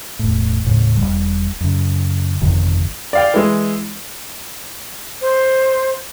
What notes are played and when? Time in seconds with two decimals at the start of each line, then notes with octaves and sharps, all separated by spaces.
0.19 E1 A2
0.65 D#1 A2 C#3
0.97 E1 C2 G3
1.61 F#2 C#3
2.41 G1 F2 C3 D#3
3.13 D5 F5 G5
3.34 E3 G#3
5.21 C5